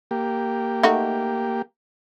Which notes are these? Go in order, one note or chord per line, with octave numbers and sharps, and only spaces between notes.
A#3 G4
A3 D#4 F#4